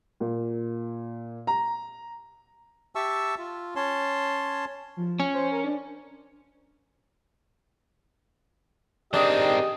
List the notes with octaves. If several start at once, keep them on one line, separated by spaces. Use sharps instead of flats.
A#2
A#5
G4 E5 A5 C#6 E6
F4
C#4 C#5 A5 C6
F3
C#4
C5
A#4
D4
D#3 C4 D4 G4 G#4 D#5